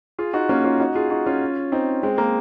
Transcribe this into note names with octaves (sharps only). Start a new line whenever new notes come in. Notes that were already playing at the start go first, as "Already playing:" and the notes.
F4 G#4
D#4 F#4
A#3 C#4
C#4 F4
D#4 F#4
F4 G#4
D#4 F#4
C#4 F4
C4 D#4
G#3 C4
A#3